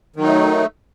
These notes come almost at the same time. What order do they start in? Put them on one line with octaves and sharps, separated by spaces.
D#3 F#3 D#4 A3